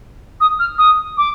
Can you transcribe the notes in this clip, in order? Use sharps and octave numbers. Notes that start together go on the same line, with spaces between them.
D#6
F6
D#6
D6